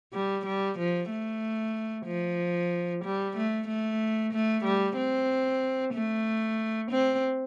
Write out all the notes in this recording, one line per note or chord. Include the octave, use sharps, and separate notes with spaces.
G3
G3
F3
A3
F3
G3
A3
A3
A3
G3
C4
A3
C4